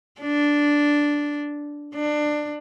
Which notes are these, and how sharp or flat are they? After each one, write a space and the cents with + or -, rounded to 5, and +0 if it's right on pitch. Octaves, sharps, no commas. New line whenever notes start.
D4 -5
D4 +20